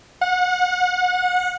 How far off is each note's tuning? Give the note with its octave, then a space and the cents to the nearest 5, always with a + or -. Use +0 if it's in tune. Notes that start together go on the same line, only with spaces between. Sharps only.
F#5 -30